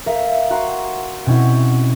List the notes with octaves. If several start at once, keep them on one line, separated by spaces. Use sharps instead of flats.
A#4 E5 F5
F#4 F#5 A#5 C6
B2 C4 C#4 E4